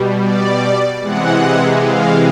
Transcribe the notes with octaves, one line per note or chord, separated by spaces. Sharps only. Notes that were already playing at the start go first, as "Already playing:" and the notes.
Already playing: B2 G3
D5
C3 E3 G#3 F#5
F5